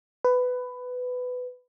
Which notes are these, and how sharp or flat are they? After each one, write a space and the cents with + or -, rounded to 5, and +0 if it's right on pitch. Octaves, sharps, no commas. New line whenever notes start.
B4 +15